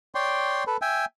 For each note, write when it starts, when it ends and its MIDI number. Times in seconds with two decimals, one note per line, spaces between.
0.15 0.64 73
0.15 0.64 74
0.15 0.64 79
0.15 0.64 84
0.67 0.77 69
0.67 0.77 71
0.82 1.05 76
0.82 1.05 79
0.82 1.05 80